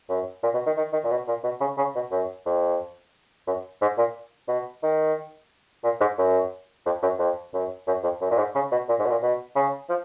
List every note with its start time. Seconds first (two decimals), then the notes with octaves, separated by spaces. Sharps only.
0.09 F#2
0.43 A#2
0.54 B2
0.66 D#3
0.77 D#3
0.93 D#3
1.04 A#2
1.11 B2
1.28 A#2
1.44 B2
1.60 C#3
1.77 C#3
1.95 B2
2.11 F#2
2.46 F2
3.47 F#2
3.81 G#2
3.98 A#2
4.48 B2
4.83 D#3
5.84 A#2
6.01 G#2
6.18 F#2
6.86 F2
7.03 F#2
7.19 F2
7.53 F#2
7.87 F#2
8.03 F2
8.21 F#2
8.31 A#2
8.38 G#2
8.55 C#3
8.72 B2
8.89 A#2
8.99 G#2
9.05 B2
9.10 A#2
9.22 B2
9.55 C#3
9.89 F3